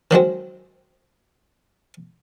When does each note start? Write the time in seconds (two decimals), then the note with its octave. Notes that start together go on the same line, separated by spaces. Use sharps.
0.11 D#3 F#3 G#3 C4